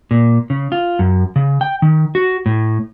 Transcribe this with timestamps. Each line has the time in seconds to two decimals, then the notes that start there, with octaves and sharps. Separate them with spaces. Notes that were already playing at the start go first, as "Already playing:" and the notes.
0.11 A#2
0.50 C#3
0.72 F4
0.99 F#2
1.36 C#3
1.61 G5
1.82 D#3
2.15 F#4
2.46 A2